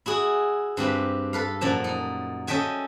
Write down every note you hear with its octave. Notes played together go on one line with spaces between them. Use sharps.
E4 F#4 G#4
G2 C4 G4 B4
A4 B4 F5
F#2 A#2 F3 A5
D#4
C#4 A4 D#5 E5 G5 G#5